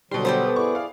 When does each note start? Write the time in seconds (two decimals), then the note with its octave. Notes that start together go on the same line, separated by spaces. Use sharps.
0.11 B2 D3 F#3 G3 C6
0.25 B3 G4 A4 C5
0.56 E4 G#4 D5 C#6
0.75 F5